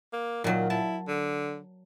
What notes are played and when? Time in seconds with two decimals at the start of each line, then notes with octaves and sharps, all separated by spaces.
0.13 A#3
0.44 A#2 D#3 F#3
0.70 E4 A5
1.08 D3